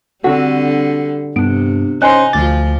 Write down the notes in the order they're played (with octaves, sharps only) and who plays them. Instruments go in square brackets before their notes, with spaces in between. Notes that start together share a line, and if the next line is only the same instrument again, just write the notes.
[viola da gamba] D3 G3 [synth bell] C4 D4 F#4 [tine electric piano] A4 [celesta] F#5
[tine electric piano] G2 [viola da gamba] C3 [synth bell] B3 D4 [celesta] D7
[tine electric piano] C#4 C5 C6 [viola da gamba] D#4 [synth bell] D#5 [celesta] G#5 F#6
[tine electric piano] D2 A6 [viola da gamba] F3 F4 [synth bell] D6